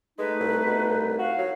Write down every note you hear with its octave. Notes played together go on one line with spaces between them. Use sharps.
G#3 A3 D#4 B4
C2
B2
C2
F#4 F5
F#3